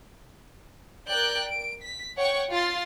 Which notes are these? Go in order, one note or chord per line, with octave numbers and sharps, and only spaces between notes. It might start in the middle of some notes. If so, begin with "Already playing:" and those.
A#4 D5 G5 F#6 G6
D7
B6
C#5 F#5 G5 C#6
F4 C6 F6 A6